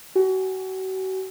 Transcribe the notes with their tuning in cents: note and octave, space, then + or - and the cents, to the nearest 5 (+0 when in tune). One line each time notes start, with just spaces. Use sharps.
F#4 +35 G#5 +0